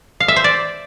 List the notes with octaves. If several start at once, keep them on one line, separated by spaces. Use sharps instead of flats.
F5
E5
C5
D5